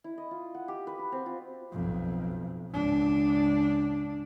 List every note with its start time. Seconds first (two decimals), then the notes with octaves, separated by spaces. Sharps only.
0.04 E4
0.18 D#5
0.31 F4
0.55 F#5
0.68 G4
0.87 B4
0.99 F#4
1.12 C4
1.26 F4
1.72 B1 F2
2.71 C#2 D4